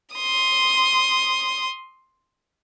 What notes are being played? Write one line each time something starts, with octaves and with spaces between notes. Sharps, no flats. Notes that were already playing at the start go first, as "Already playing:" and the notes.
C6 D#6